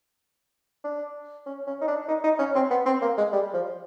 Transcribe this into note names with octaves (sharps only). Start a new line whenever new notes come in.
D4
C#4
C#4
D#4
D4
D#4
D#4
C#4
C4
B3
C4
A#3
G#3
G3
F3